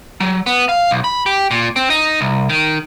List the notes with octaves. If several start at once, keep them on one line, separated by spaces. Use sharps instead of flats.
F#3
B3
F5
B1
B5
G4
A#2
C4
D#4
C2
D#3